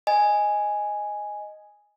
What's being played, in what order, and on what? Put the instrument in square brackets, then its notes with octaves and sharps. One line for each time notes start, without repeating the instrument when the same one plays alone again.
[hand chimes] D#5 G#5